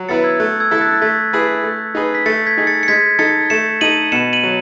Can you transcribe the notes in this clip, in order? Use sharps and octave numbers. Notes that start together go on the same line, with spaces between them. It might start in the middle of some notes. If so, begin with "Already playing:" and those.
Already playing: F#3
B3 E4 B4 A6 C#7
E6 G#6
A3 F#6
E6 G#6
E4 A4
F#6 A6
A6
A3 G#6 B6
E4 G#4 B4
A3
D#4 G#4 B4
B6
A3 A6 C#7
G#6 B6
D#4 G#4
A6 C#7
C#7
G#3 G#6 B6
D#4 A4 A6 C#7
A3 C#7 E7
D#4 A4 D#7 F#7
B2 C#7 E7
D#7 F#7
F#3